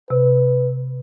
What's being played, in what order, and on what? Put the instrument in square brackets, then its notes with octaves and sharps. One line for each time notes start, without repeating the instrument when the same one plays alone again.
[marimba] C3 [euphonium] B4